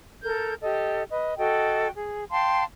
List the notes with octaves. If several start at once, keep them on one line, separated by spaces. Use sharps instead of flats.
A4 A#4 G6
G4 A4 D#5
B4 D#5
F#4 A4 D#5 G5
G#4
F5 G5 A5 C6